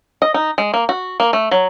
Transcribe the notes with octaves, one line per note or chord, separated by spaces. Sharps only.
D#5
D#4
G#3
A#3
F#4
A#3
A3
F#3